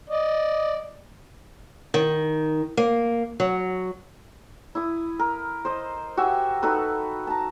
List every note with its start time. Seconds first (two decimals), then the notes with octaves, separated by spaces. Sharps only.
0.10 D5 D#5
1.94 D#3
2.77 A#3
3.40 F#3
4.75 E4 D#6
5.19 A#4
5.65 C5 D#5
6.17 F#4 G4 E5 G#5
6.63 D#4 F#4 A4 B4
7.27 A5 A#5